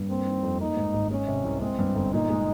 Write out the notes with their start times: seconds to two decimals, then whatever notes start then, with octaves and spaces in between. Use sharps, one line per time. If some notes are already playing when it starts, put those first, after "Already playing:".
Already playing: G2
0.09 A#3 C4
0.26 D#3
0.43 F2
0.59 A#3 D#4
0.77 G#2
0.94 G#1
1.11 G#3 C#4
1.27 C3
1.44 C2
1.61 G#3 C4
1.79 G2
1.95 G1
2.13 A#2 D#4
2.30 G#3